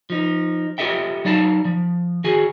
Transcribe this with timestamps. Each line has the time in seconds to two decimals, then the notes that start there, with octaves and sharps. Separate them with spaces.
0.10 F3 D#4
0.78 F4 G4 A4 D#5 E5 G5
1.25 F#3 D#4 D5 F5 A5
1.65 F3
2.24 D#3 F#4 G#4 G#5